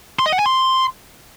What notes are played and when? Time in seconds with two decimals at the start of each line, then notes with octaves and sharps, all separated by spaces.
0.19 C6
0.26 D#5
0.32 F#5
0.39 G#5
0.46 C6